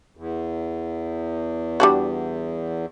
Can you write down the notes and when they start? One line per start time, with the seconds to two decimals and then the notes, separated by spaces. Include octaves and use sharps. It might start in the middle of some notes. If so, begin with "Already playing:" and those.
0.17 E2
1.80 G3 D4 F#4